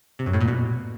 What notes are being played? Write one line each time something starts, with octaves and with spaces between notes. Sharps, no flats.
C3
F#2
A2
A#2
B2